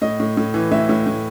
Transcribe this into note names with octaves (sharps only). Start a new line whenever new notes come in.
A2 D#5
A2
A2
E3
A2 E5
A2
A2